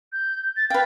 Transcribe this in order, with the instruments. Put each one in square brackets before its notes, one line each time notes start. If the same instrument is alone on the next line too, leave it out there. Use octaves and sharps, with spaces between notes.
[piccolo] G6
A6
[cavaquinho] B4 G5 [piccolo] F5